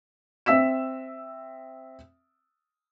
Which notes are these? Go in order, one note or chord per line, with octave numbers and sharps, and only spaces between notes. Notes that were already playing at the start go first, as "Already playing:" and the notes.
C4 E5 E6 B6 E7